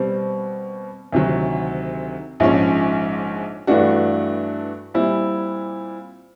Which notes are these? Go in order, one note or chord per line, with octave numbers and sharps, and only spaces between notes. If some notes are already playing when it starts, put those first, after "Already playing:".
Already playing: B2 G3 C4
D2 C3 D#3 F#3
A#1 G#2 F3 G#3 C#4
G2 E3 A3 D4 F#4
A#2 G3 C4 E4